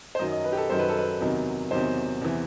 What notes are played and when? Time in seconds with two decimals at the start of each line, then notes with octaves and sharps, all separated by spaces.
0.15 C5
0.19 F#2 D#3 F#3 D#5
0.32 D#5
0.44 B4
0.52 G4
0.57 A4
0.70 F#2 D#3 F#3 C5
0.79 B4
0.89 A4
0.98 B4
1.20 E2 C3 D#3 F#3
1.71 E2 C3 D#3 F#3 C5
2.21 E2 C3 E3